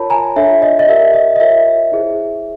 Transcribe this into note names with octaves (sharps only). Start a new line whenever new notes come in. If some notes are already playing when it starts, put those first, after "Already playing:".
Already playing: F4 A#4 C#5 A5 B5
G#5 A#5
D4 F4 A4 C#5 E5
D#5
D#5
G4 A#4 D5 E5
D#5
D#5
F4 A#4 C#5 E5
E4 G#4 C5